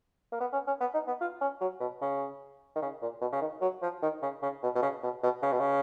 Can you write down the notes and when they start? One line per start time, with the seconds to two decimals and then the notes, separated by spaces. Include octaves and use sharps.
0.32 A#3
0.40 B3
0.53 C#4
0.67 C#4
0.81 B3
0.94 D#4
1.07 B3
1.21 F4
1.41 C#4
1.61 F#3
1.80 B2
2.01 C#3
2.76 D#3
2.82 C#3
3.02 A#2
3.21 B2
3.32 C#3
3.42 D#3
3.61 F#3
3.82 F3
4.02 D#3
4.22 C#3
4.42 C#3
4.63 B2
4.75 B2
4.82 C#3
5.03 B2
5.23 B2
5.42 C#3
5.52 B2
5.60 C#3